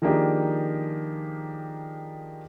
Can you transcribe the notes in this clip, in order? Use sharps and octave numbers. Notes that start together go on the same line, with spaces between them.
D#3 F3 A#3 D4 G4 G#4